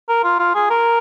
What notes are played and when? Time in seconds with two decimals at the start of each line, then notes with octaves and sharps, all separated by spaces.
0.08 A#4
0.24 F4
0.39 F4
0.55 G#4
0.70 A#4